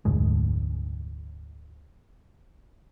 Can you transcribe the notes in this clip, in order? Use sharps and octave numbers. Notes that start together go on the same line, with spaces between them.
F1 D2 G#2 G#3